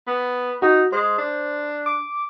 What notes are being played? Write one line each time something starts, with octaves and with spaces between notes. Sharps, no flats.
B3
D#4 F#4
G#3 C5
D4
D6